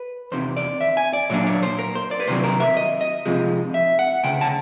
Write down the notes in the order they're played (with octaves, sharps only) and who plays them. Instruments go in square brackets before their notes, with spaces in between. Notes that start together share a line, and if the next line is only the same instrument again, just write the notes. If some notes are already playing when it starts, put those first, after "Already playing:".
Already playing: [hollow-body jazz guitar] B4
E2 C3 D#3 C5
D5
E5
G#5
D5
A#2 F#3 A#3 D4 C#5
C#5
C5
A#4
C5
D5
B4
C2 C3 D#3 F#3 C5
A#4
E5
D#5
D#5
C3 F3 G#3
E5
F#5
D2 C#3 G5
A5